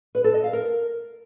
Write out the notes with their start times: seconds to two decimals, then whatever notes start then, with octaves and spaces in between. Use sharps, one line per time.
0.15 B4
0.24 A4
0.34 D#5
0.44 F5
0.53 A#4